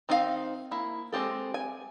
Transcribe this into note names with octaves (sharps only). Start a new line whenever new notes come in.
D#3 C4 D#4 E4 F5
A#3 E4
G#3 C4 G4 A4
G#5